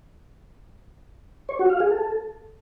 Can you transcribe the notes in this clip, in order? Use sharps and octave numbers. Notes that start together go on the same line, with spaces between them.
C#5
F#4
F5
G#4
A4